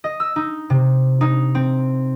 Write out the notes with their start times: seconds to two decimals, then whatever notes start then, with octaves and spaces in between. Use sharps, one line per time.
0.04 D#5
0.20 E6
0.36 D#4
0.70 C3
1.21 D#4
1.55 C4